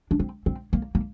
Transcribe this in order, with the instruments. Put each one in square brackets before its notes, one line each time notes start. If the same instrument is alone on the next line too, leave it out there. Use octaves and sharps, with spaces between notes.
[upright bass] D4
C4
C4
A#3
A#3